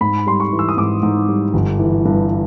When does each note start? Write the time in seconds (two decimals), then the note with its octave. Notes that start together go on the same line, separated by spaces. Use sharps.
0.01 G#2 B5
0.27 G3 C6
0.40 C#6
0.53 E3
0.59 E6
0.69 D#6
0.77 G#2 D6
1.03 G#2
1.28 G3
1.54 G1
1.79 E3
2.05 G2